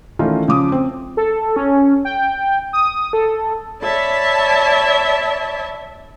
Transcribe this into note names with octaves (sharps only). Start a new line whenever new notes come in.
D#3 E3 A3 C#4 D#4 F4
C#3 F3 D6 D#6
C4
A4
C#4
G5
D#6
A4
C#5 D5 E5 A5 B5